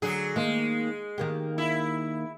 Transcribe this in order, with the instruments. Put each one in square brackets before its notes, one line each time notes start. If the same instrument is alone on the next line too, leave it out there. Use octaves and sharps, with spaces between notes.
[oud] D3 [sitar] F#3 G#4
[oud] D#3 A#3 C5 [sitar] G#3
[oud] D#3 A#3 G4
[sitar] E4